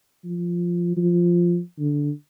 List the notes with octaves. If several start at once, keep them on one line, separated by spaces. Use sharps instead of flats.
F3
F3
D3